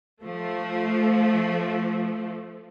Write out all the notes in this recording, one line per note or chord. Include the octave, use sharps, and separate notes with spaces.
F3 A3